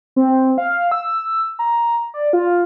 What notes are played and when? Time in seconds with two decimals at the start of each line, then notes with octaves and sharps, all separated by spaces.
0.16 C4
0.58 F5
0.92 E6
1.59 A#5
2.14 D5
2.33 F4